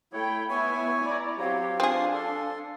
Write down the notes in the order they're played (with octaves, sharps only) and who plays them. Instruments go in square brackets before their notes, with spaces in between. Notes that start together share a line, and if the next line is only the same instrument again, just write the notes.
[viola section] A3 G5 B5 [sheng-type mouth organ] E4 C#5
[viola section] B3 E4 [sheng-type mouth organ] C#5 G#5 [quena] C#6
[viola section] E4 D5 A#5
[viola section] F#3 G4 [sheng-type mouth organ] C4 C#5 [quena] F5
[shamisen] C4 G#4 [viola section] D4 [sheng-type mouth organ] F4 C6 D#6
[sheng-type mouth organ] A4 C6